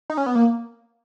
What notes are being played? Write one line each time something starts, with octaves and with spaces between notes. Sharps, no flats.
D#4
C#4
B3
A#3